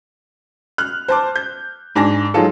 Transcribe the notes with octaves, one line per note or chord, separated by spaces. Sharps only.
F6 F#6
C5 A5 D6
G6
G#2 D4 G#5 A#6
F#3 G#3 D#4 F4 A4